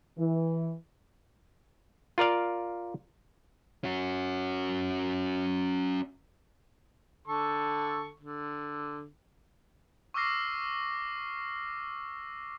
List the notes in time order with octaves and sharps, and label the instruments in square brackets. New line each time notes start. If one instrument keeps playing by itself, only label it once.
[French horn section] E3
[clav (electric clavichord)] F4 A#4 D5 F5
[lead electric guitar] C#4 F#4
[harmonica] D3 A4 C#6
D3
[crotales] C#6 D6 E6 F6 A#6 C7